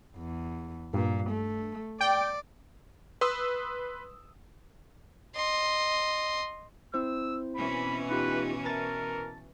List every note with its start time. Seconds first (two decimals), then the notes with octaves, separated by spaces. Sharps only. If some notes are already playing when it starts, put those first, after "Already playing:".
0.17 E2
0.93 G2 A#2
1.30 A3
2.01 D5 G5
3.21 B4 C6 D#6 E6
5.35 D#5 C6
6.94 C4 E4 C5 E6
7.56 B2 E3 C#4 B5
8.10 D#4 F4 G4 B4
8.66 A#4 A5 A6